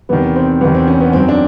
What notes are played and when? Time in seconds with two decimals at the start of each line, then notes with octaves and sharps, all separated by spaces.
0.09 E2 C3 D#3 B3
0.36 C4
0.61 E2 C3 D#3 B3
0.75 C4
0.88 C#4
1.00 B3
1.13 F#2 D#3 C4
1.28 D4